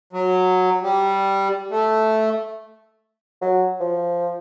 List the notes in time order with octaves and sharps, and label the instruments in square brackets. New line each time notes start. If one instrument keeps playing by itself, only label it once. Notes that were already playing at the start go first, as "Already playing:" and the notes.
[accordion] F#3
G3
A3
[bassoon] F#3
F3